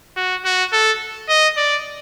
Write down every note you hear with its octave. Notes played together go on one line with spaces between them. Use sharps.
F#4
F#4
A4
D#5
D5